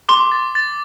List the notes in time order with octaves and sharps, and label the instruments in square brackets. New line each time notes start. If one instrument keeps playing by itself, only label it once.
[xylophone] C6 [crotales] D6
[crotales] A6
A6